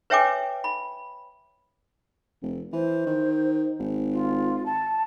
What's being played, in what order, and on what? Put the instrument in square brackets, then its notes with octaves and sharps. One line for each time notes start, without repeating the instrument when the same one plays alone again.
[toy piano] B4 C#5 E5 G5 G#5 D6
B5
[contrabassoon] F1
[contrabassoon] E3 [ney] C5
[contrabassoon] D#3
G#1
[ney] F4
A5